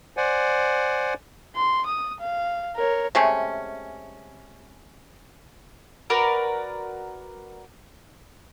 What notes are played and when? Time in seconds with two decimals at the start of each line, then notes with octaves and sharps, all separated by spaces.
0.17 C5 D5 F#5 G#5
1.56 C6
1.86 D#6
2.20 F5
2.76 A#4 C#5
3.15 C3 G#3 A3 C#4
6.10 F#4 A#4 B4 D5